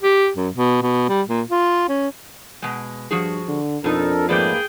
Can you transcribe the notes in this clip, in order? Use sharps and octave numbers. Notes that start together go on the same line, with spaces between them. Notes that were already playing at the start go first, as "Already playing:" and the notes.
G4
F#2
B2
B2
G3
A#2
F4
C#4
B2 G#3
G2 F3 F#4 G#4
D3
F2 B2 D4 D#4 A4 A#4
G#2 F3 A3 A#3 G#4 B4 D5 G5